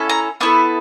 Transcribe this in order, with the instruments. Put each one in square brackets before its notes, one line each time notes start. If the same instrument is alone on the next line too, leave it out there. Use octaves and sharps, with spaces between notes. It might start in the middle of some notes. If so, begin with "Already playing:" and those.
Already playing: [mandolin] C#4 E4 A4
A#5
B3 E4 A4 C#6